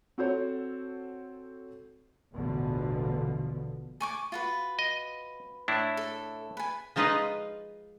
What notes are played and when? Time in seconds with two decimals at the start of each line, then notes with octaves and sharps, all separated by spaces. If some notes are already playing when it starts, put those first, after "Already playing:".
0.18 C4 F#4 A4 C5 C#5
2.32 A1 E2 B2 D3 F3
4.00 G#5 C#6 D6
4.32 F4 F#4 B4
4.79 D#5
5.68 A2 D4 E4
5.97 A4
6.57 B4 G#5
6.96 F3 G#3 D#4 F4 B4 D#5